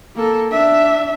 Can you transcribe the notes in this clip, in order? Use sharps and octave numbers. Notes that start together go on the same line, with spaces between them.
A#3 A4
D4 E5